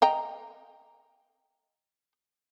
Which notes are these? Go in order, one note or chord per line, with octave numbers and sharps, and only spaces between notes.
D#5 G5 A#5